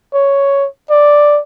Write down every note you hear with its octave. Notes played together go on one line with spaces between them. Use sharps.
C#5
D5